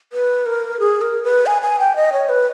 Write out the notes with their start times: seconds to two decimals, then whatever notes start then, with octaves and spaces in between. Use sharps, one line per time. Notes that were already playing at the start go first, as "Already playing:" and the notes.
0.13 B4
0.46 A#4
0.80 G#4
1.01 A#4
1.24 B4
1.46 G#5
1.62 G#5
1.80 G5
1.96 D#5
2.13 C#5
2.29 B4